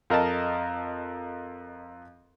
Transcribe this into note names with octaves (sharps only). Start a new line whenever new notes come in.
F2 A#4 D#5 A5